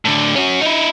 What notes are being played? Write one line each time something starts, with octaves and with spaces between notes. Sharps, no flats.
A2 D3
C#4 F#4
D#4 E4